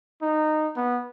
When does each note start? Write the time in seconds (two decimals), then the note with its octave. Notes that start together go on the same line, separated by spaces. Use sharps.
0.22 D#4
0.76 B3